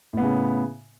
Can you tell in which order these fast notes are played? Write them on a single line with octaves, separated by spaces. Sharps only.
A2 B3 C#3